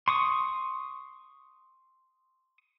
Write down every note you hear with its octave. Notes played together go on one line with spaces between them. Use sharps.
C6 C#6 D#6